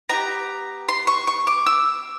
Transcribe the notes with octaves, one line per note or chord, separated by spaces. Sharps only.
B3 D#4 G4 A#5
C6
C#6
C#6
D6
E6